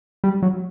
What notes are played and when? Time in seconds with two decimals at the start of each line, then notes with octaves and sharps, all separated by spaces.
0.24 G3
0.42 F#3